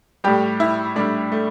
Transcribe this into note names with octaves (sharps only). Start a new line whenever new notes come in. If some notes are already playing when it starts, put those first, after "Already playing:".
A2 G3 G4
E4
A2 G3 D4
A3